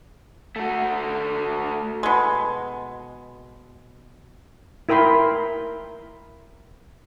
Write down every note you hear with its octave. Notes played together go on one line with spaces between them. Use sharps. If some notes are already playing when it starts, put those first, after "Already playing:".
A3 F#4
B2 G#3
E4 A#4 G5 B5 C6